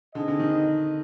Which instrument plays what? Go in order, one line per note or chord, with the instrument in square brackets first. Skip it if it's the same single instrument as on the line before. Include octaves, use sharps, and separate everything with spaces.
[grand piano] D3 [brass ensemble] C4 D#4 G#4 D#5
[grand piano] D3
D#3